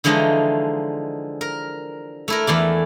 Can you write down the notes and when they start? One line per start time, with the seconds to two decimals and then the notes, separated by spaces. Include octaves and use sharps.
0.04 D3 E3 F3 G#3 D#4 C#5
1.41 A#4
2.28 A3 E4 A#4
2.47 E2 E3 A3 D5